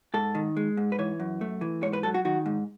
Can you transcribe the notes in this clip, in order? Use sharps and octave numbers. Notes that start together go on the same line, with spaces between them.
G#2 A4
D#3
G#3
G#2
B4
E3 C#5
F#2
A3
E3
G#2 C#5
B4
F#3 A4
F#4
D#3 F#4
G#2